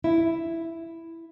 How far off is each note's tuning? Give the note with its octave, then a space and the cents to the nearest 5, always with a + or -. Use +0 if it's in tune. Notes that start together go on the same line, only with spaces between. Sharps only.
E4 +5